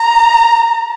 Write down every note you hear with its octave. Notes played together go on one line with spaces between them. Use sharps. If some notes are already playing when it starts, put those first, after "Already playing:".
Already playing: A#5